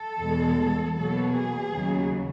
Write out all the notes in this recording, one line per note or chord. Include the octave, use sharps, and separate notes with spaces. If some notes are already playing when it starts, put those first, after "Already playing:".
Already playing: A4
E2 B2 G#3
B2 F#3 A#3 A4
G#4
D#2 C#3 F#3